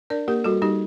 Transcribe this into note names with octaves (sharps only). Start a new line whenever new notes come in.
D4 A#4 D5
A#3 G4 A#4
G3 F#4 A4
G3 D#4 G4